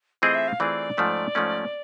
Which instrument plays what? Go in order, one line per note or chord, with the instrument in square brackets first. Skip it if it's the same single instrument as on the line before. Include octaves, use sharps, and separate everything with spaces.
[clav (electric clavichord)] E3 A3 C4 F4 G#4 [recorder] D#5
[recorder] E5
F5
[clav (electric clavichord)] E3 A3 C4 F4 G#4 [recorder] D5
[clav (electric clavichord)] G#2 F3 A3 C#4
G#2 F3 A3 C#4